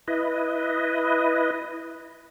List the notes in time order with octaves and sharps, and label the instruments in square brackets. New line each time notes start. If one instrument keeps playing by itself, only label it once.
[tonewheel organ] E4 B4 D#5